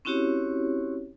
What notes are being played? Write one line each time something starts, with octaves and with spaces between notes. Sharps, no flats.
C4 C#4 E4 F#4 G4 C#5